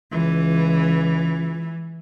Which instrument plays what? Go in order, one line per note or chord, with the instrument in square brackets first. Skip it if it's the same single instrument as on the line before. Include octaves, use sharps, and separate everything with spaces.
[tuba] C#2 [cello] E3